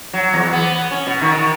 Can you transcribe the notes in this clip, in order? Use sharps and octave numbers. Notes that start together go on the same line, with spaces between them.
F#3
E2
B3
C#4
B2
D#3
D#3